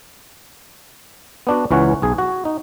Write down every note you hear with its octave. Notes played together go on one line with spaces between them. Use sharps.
B3 D4 F#4
C#2 E3 C#4 C#5 F#5
B1 G#4
F#4
D#4